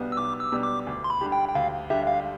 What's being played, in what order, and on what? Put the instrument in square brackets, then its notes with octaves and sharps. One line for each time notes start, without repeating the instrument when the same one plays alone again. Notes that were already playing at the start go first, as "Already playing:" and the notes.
Already playing: [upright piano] B1 B2 G3 B3 D4
[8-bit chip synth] E6
[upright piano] B1 [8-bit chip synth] D6
[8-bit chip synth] E6
[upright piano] B2 G3 B3 D4
[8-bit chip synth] D6
[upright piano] D2
[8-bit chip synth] C6
B5
[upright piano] D3 G3 D4 G4
[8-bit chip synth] G5
G5
[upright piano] D2 [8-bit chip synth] F5
[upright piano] D3 G3 D4 G4 [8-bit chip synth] E5
[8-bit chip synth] F5